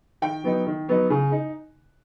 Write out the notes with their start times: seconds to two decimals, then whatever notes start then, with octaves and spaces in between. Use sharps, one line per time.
0.22 D#3 G5
0.44 F#3 B3 D#4
0.67 D#3
0.88 F#3 B3 D#4
1.10 C#3
1.32 D#4